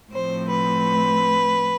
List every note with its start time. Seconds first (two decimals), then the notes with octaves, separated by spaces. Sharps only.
0.12 A2 F3 A3 C4 C5
0.49 B4